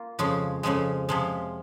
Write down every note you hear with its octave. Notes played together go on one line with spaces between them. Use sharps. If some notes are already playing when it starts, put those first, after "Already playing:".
Already playing: A#3 F4
F2 C#3 F3 G#3
F2 C#3 F3 G#3
C3 F3 G#3